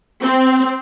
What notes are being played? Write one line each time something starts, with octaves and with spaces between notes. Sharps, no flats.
C4